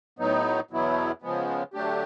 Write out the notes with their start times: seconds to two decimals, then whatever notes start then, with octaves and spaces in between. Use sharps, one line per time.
0.19 A2 F#3 B3 D#4
0.71 E2 B2 F#3 B3 E4
1.22 C#3 F3 G#3 B3
1.74 D3 F#3 A3 D4 G4